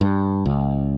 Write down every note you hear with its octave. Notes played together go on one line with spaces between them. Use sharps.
G2
C#2